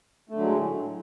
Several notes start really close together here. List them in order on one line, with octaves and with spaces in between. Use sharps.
A3 D3 F#3 G#3 A2